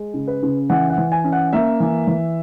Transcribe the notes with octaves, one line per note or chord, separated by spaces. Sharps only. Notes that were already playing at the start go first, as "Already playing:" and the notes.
Already playing: G#3
C#3
B4
C#3
E3 F#5
F#5
E3
G#5
C#4
F#5
A#3 E5
E3
E3